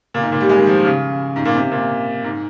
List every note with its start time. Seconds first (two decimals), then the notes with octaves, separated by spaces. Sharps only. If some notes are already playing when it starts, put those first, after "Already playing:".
0.14 A#2
0.23 G#2
0.32 A#2
0.41 G3
0.49 G#3
0.58 D#3
0.67 F3
0.85 C#3
1.36 G#2
1.45 A#2
1.54 C3
1.72 A#2
2.24 G#2